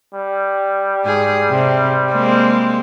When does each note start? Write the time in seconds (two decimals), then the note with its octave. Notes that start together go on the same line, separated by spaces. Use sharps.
0.14 G3
1.04 G#2 G#4
1.51 C3
2.11 G#3 A#3 C4